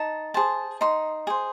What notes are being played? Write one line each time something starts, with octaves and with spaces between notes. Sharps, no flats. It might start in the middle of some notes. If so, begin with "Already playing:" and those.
Already playing: D#4 A5
G#4 C5 A5
D#4 C6
G#4 C5